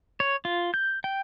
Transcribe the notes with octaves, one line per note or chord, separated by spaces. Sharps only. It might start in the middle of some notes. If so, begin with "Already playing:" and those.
C#5
F4
G6
G5